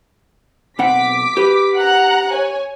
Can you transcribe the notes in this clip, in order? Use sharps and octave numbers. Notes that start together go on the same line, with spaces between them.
B1 C4 F#5 D6 B6
G4 B4
F#5 A#5 F#6
C#5 G#5